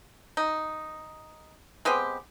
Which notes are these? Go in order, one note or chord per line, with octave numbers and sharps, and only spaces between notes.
D#4
G#3 B3 C4 G4